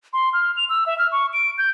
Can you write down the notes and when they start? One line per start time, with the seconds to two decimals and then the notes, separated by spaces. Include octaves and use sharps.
0.13 C6
0.33 F6
0.57 F7
0.69 E6
0.86 E5
0.98 F6
1.12 C#6
1.33 D7
1.58 G6